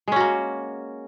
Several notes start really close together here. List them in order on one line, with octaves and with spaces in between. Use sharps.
G#3 C#4 F#4 A#3